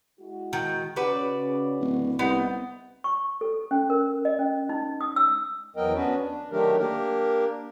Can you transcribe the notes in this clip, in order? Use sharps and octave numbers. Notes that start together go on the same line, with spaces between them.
G#3 E4 F#4
D#3
C#3 F#4 B4 D5
D1
C2 B3 D#4
C#6
A4
C#4
A#4
D#5
C#4
D#4
D#6
E6
E2 F#3 B3 A#4 D#5 G5
B3 C#4 D4 F#4 B4
D4
D#3 F#3 A3 D4 G4 A#4
A#3 D4 G4 A#4